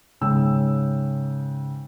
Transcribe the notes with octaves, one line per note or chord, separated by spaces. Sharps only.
G#2 C#3 G5 E6